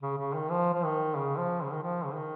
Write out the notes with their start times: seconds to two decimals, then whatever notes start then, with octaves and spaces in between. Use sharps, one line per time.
0.02 C#3
0.18 C#3
0.35 D#3
0.51 F3
0.73 F3
0.84 D#3
1.17 C#3
1.38 F3
1.63 C#3
1.73 D#3
1.83 F3
2.05 C#3
2.15 D#3